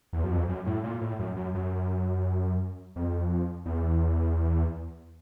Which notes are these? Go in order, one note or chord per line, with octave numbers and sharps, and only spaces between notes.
E2
F#2
F2
F#2
A2
A#2
A2
F#2
F#2
F#2
F2
E2